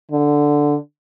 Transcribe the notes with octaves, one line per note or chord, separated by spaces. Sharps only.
D3